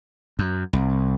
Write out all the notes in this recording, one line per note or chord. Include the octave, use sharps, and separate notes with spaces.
F#2
C2